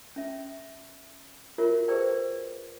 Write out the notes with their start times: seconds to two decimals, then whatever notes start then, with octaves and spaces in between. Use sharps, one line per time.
0.16 C#4 E5
1.58 F4 F#4 A#4 C#5 E5
1.88 G4 G#4 B4 C5 D5 G5